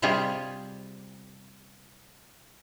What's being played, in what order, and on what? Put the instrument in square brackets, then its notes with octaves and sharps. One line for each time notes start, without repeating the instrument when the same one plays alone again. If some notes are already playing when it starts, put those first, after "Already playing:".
[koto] C3 G3 F4 G4 G#4